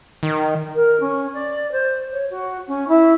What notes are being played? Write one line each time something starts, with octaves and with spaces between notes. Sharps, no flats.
D#3
A#4
C#4
D5
C5
C#5
F#4
C#4
E4